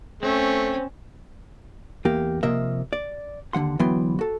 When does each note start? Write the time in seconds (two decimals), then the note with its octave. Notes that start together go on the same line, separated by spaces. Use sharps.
0.23 A3 C4 C#4
2.05 E2 A#3 G4
2.43 C3 F3 A#3 D#5 E5
2.93 D5
3.53 D#2 D3 F3 F#5 C6
3.79 D2 E3 F#3 B3 G5 C6
4.19 F#4 A4